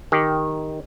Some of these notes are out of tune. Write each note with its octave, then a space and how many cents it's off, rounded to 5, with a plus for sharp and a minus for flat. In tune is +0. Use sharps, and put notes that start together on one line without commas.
D#3 +0 G4 +0